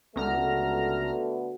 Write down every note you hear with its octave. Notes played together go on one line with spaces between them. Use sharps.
C#2 B2 D3 A3 B3 A#5 F6